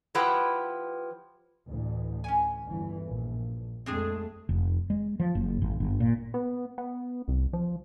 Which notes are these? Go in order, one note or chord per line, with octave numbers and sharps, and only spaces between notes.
F3 E4 G4 B4 F#5 G5
A1 D2 E3
C#4 G#5
G1 E3
A#1
F2 G#3 A3 C4 D4 G#4
F1
G#3
F3
F#1
G#1
G1
A#2
B3
B3
C2
F3